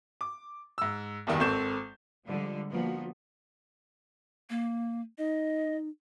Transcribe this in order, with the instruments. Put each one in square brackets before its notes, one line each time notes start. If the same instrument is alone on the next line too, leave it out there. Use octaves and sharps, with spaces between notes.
[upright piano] D6
G#2 E6
F#1 E2 G2 D#3
G#1 C4 A4 C#6 G6 E7
[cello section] D3 F3 G3 G#3
F3 A#3 B3 F#4
[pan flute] A#3
[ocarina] D#4 [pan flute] D#5